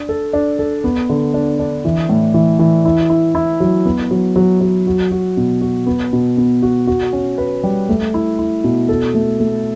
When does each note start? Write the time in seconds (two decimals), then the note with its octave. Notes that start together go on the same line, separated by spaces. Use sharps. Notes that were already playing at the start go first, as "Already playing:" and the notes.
Already playing: D4
0.09 A4
0.33 D4
0.59 A4
0.84 B3
1.09 D3
1.34 D4
1.59 D4
1.85 E3
2.09 A2
2.34 E3
2.59 E3
2.85 E4
3.10 E4
3.35 E4
3.60 F#3
3.86 B3
4.11 F#3
4.36 F#3
4.61 F#3
4.87 F#4
5.11 F#4
5.37 B2
5.61 F#4
5.86 B3
6.13 B2
6.37 B3
6.62 F#4
6.87 F#4
7.13 C#4
7.38 B4
7.63 G3
7.89 A3
8.14 E4
8.39 E4
8.64 B2
8.89 A4
9.14 A3
9.40 A3